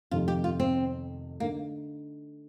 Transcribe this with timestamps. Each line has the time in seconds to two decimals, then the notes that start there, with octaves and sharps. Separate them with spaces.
0.11 F2 C3 D#3 A3 F4
0.28 G4
0.44 F4
0.60 C4
1.40 D3 A3 A#3 D#4